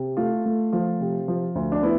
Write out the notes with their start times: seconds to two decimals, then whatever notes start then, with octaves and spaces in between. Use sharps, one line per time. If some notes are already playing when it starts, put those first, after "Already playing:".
Already playing: C3
0.17 A3 F4
0.46 A3
0.73 F3 F4
1.00 C3
1.28 F3
1.55 D2
1.72 D4
1.83 B3 E4